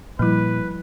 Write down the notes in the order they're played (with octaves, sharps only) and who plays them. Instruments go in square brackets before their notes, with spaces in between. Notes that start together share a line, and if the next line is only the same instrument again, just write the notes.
[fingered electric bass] A#2 [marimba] F3 G3 E4 [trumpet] B4